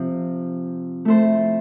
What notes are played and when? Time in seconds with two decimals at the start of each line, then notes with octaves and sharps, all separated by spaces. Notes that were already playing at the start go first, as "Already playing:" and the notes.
Already playing: C3 F3 C4
1.05 A3 E4 A4 C5